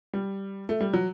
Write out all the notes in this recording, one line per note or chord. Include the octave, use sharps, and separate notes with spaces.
G3
A3
G3
F#3